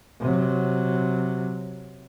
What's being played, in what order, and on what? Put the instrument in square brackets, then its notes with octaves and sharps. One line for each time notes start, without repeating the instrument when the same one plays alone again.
[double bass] C3 F#3